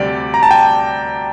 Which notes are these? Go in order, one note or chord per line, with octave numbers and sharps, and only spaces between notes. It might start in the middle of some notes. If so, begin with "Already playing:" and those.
Already playing: D2 C3 G3 G4 D5
A#5
A5
G5